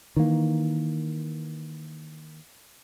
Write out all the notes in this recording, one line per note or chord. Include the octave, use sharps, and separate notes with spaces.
D#3 E3 A#3